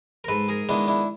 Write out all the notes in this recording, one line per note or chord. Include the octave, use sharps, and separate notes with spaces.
A#4
G#2 A4 B4
G#4 A#4
D#3 G#3 B3 D4 E4
D4 E4